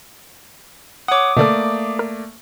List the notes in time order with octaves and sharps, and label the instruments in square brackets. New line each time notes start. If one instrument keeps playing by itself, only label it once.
[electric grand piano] C#5 F#5 [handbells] D6 D#6
[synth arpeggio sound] B2 D3 A4 [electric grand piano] A3 A#3 D5
[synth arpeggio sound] A#4